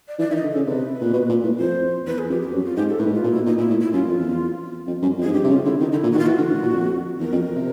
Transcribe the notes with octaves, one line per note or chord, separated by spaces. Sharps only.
D5
E3 D5
D#3 E5
D#5
D3
C#3 A4
C3 B4
A#2
B2
A#2
A2
F2 C5
E2 B4
G#4
F2 G4
G4
F2
F#2 F#4
F4
G#2 G4
A4
A2 B4
G#2
A2
F4
A#2
B2 E4
A#2 D#4
A#2 E4
A2
E4
F#2 F4
F2
E2
F2
F#2
F2
G#2 G#4
G2 G4
C3
C#3 F4
D3 E4
D#3 D#4
D3 D#4
E4
A#2
D#3 F#4
F4
E3 F#4
D3
A2
A#2
F2
E2 A#4
F2
C3